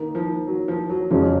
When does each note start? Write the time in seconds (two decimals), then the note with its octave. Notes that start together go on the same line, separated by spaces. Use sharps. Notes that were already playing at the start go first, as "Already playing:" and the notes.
Already playing: D#3 A#3 D#4
0.15 F3
0.47 F#3
0.68 F3
0.89 F#3
1.11 F2 C#3 F3 F#3 G#3 C#4